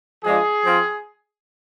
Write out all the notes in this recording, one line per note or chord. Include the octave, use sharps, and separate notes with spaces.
F3 G#3 D4 F4 G#4
F3 C4 F4